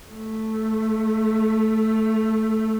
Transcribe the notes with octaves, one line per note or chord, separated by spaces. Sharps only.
A3